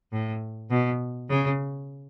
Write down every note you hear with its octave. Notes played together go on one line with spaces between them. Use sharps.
A2
B2
C#3